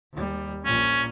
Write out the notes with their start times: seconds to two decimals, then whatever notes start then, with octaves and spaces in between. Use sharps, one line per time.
0.13 D#2 G3
0.65 A#1 A#2 C#4